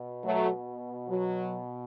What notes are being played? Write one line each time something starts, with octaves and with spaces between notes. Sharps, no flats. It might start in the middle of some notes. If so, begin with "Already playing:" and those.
Already playing: B2
F#3 A3
F#3